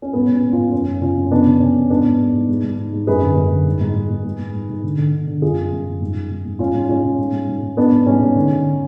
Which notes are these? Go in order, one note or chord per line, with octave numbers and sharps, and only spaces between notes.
C#4
G#2 B3
G#2
C#4
G#2
C#4 F4
G#2
F#2 C#4
F#2
C#3 C#4 F4
F#2
C#3 B3 D4
C#3
C#3 C#4
F2
G#2 B3 D4
G#2
G#2
G#2
G#2
G#2
G#2
G#2
F#2 G#4 B4
D3
F#2
D3
G#2
G#2
G#2
G#2
G#2
G#2
G#2
G#2
D3
D3
D3
D3
F#2 F4 G#4
F#2
F#2
F#2
G#2
G#2
G#2
G#2
G#2 C#4 F4
G#2
G#2 C#4 F4
G#2
G#2
G#2
G#2
G#2
G#2 B3 D4
G#2
G#2 C#4
G#2
D3
D3